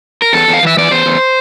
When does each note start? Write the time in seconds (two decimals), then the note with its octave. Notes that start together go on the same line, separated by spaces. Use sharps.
0.22 A#4
0.33 E2 A4
0.48 E2
0.54 F5
0.63 E3 E5
0.77 E3 D5
0.91 E2 C5
1.06 E2